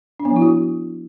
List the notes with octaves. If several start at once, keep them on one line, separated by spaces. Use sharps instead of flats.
D4
B3
F3
E4
F#4